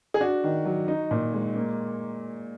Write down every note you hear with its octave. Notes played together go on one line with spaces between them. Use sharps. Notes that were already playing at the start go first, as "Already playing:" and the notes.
G#4
D4 F#4
D#3
F#3
D#4
A#2
G#3
A#3